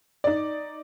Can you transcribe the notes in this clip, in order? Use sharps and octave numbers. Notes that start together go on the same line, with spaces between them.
D#4 D5